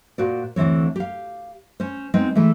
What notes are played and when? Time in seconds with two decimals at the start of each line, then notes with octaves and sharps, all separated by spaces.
0.18 A#2 F#4 C5 D5
0.56 D2 D3 E3 C4 C#5
0.96 G4 F5
1.80 C#4 C5
2.14 G#3 B3 C4 D#4
2.35 E3 G#3 A3